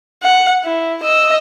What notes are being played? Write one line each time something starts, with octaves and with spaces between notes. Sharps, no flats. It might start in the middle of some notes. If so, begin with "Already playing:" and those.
F#5
E4
D#5 E6